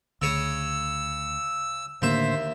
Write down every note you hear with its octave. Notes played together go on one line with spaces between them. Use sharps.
D2 C#3 C#5 D#6 E6
D#2 A2 D3 A#3 C5 E5